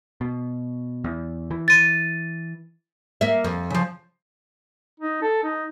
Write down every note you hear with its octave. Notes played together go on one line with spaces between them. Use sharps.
B2
E2
E3
A6 D#7
A#3 E5
F2
C#3 F3
D#4
A4
D#4